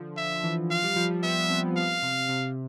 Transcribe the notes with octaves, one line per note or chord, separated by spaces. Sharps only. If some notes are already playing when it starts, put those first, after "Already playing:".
Already playing: D3 F3
D3 E5
E3
F3 F5
G3
F3
G3
B3 E5
C4
F5
C3
C3